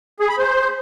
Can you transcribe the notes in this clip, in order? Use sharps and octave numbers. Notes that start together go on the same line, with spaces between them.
G#4
B5
C5